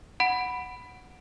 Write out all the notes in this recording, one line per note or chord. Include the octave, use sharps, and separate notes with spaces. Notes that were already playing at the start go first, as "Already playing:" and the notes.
F#5 B5 D7